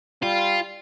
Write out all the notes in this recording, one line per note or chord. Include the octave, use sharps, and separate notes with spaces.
G3 F4